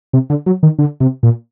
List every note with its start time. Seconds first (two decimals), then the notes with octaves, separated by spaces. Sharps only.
0.13 C3
0.30 D3
0.46 F#3
0.63 D#3
0.79 D3
1.00 C3
1.23 A#2